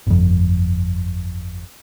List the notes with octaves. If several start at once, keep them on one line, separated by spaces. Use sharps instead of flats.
G1 F2